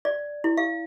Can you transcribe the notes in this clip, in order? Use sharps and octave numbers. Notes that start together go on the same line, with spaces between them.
D5
E4
F5